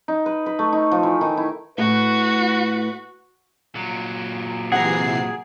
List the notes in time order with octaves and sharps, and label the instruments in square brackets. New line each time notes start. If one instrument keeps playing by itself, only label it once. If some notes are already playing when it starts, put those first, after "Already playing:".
[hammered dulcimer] D#4
B4
B4
A3
D#4
F3
E3
D#3
E4
[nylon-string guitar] A2 A3 [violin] F#4 [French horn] B4
[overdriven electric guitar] A#2 F#3
[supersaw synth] C3 E3 C7 [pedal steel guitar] G#4 [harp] F#5 A#5